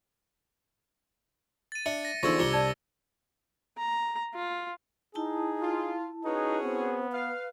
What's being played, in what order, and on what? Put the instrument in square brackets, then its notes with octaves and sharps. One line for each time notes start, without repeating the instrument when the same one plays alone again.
[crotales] A6 D#7
[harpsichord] D4 [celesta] E5 [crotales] C#7
[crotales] A#6
[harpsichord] E2 D3 F3 [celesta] D#4 C#6 [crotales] E6 G#6 A#6
[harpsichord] C2 D4 [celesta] F4 [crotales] D6 C#7 G7
[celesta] D5 A5 G#6
[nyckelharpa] A#5
F4
[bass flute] D#4 [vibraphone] E4 A5 [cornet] G#4
[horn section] F4
[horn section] C#4 F#4 G#4 [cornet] D#4 [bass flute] B4
[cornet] B3 [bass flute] C4
[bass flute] B4 [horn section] F5